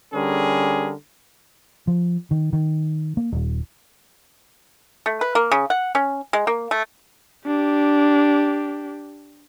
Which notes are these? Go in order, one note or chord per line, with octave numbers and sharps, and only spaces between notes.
D3 G3 C#4 G#4 A#4
F3
D#3
D#3
A#3
D#1
A3
B4
A#3
C#3
F#5
C#4
G#3
A#3
A3
D4 G4